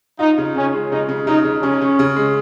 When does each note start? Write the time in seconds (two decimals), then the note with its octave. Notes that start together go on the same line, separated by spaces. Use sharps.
0.19 D#4 F4
0.38 C#3
0.56 C#3 C#4
0.74 G#3
0.91 C#3 D#4
1.09 C#3
1.27 C#3 D#4
1.45 C#3
1.62 C#3 C#4
1.81 C#3
1.99 C#3
2.16 G#3